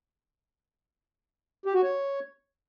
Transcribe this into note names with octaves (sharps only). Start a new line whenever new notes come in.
G4
F#4
C#5